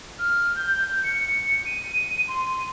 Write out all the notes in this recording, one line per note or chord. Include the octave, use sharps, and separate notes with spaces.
F6
G6
C#7
D#7
C6